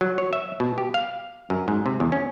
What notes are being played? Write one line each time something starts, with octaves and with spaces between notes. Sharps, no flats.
F#3
C#5
E5
B2
G4
F5
F#2
G#2
C3
E2
C#4